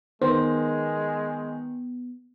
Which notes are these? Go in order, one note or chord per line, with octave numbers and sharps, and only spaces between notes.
D#3 G#3 B3 C5